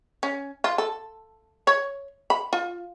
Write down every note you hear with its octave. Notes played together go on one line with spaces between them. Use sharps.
C#4
F4
A4
C#5
B5
F4